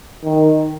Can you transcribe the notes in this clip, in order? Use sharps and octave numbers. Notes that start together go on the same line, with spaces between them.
D#3